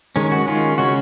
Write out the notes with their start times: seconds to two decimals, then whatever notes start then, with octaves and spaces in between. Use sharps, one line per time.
0.16 D#3 G#3 C#4
0.32 F#4
0.47 D#3 G#3 C#4 F4
0.78 C#3 G#3 C#4 F#4